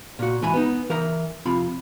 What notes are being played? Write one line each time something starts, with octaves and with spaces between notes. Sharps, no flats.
A#2 F#4
G#2 E3 G#5 B5
B3 D#4
E3 A#4 E5 A#5
F2 C3 F4 B5